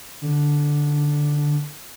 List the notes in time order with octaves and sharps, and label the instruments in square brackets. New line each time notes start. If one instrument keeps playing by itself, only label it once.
[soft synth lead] D3